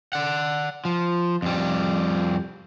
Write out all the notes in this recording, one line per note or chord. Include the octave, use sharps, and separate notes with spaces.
D5 F#5
F3
F2 G3